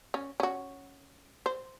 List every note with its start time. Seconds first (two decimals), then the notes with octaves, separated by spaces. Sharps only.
0.14 C#4
0.40 C#4 F#4
1.46 C5